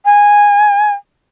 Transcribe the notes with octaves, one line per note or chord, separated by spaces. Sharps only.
G#5